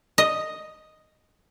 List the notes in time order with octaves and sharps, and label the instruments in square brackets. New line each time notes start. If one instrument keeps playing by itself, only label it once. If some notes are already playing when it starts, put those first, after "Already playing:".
[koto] D#5